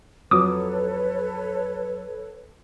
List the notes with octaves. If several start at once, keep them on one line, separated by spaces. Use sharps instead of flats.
F2 F#3 A4 B4 C#5 D6 D#6